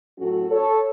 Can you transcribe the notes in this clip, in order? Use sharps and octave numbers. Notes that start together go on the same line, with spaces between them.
A2 F#3 C#4 F#4 A4
A4 C#5